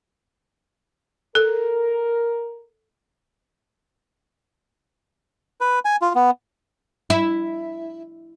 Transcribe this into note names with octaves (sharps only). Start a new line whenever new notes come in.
A4 A#4
B4
G#5
F4
B3
E4